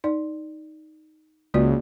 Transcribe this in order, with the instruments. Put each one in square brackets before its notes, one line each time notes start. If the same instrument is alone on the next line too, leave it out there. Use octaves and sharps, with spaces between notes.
[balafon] D#4 D5
[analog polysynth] C#2 [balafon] A#3 F#4 D5